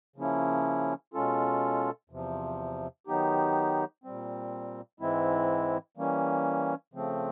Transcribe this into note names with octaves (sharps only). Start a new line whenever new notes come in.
C#3 F3 A#3 C#4 E4
B2 G#3 C#4 F4 A4
E2 C3 F3
D#3 F#3 B3 D#4 G4
A#2 G3 C4
G#2 E3 G#3 C4 E4
E3 G3 A#3 C#4
C#3 F3 A3 C4